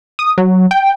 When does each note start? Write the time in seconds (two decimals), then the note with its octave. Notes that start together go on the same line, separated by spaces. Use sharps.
0.19 D#6
0.38 F#3
0.71 G5